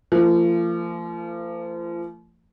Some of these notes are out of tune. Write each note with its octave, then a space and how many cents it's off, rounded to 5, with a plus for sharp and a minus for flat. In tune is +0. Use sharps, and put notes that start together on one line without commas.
F3 -35 A3 +40